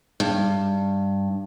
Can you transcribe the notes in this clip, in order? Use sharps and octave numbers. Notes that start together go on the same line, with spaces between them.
G2